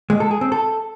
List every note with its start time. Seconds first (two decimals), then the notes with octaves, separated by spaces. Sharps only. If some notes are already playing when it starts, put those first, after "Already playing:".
0.10 G#3
0.20 A4
0.31 G#4
0.41 C4
0.52 A4